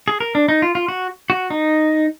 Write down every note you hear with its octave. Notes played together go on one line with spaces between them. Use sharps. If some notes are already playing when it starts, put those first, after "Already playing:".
G#4
A#4
D4
D#4
F4
F4
F#4
F#4
D#4